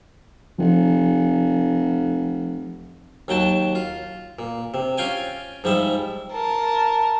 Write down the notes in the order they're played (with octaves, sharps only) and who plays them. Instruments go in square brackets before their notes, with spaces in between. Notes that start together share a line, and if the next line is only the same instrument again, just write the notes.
[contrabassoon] F1 [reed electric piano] F3
[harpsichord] D#2 F#3 G5 A5
F4
A#2
C3
C#4 F4 F5 G5 G#5
G#2 F3 G3 E5
[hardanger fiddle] A#4 A5